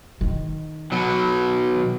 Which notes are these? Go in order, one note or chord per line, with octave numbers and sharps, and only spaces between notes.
D#3
B2 F#3